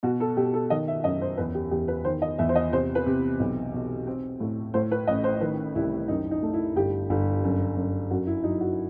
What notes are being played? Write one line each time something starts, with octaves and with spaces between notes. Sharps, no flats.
B2 F#4
A4
B2 G4
A4
D#3 D#5
E5
F#2 D#5
C5
E2 B4
G4
E2 G4
B4
D#3 C5
D#5
E2 E5
C5
D#5
C3 C5
B4
C3
B1
B2
C4
A2
A2 C5
B4
A1 D#5
C5
D#3 B4
C2 E4
F#2 D#4
D#4
A3
E4
G1 G4
G1
F#2
F#2
F#2 F#4
E4
F#3 D#4
F#4